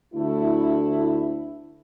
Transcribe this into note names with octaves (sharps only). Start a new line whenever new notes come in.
D2 A3 E4